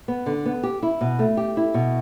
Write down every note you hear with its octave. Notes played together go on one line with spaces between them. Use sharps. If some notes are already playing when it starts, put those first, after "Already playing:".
B3
D3
B3
G4
E4
B2
A3
G4
E4
B2